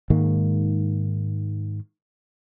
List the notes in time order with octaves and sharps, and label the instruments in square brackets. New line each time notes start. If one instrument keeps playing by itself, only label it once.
[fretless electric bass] G#2 D#3 G#3 A#3